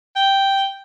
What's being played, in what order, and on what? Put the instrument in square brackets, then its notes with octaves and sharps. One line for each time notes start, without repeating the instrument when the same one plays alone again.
[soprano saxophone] G5